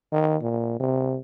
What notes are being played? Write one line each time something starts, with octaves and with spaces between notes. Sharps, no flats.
D#3
A#2
C3